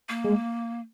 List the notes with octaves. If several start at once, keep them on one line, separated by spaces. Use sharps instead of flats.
A#3
G#3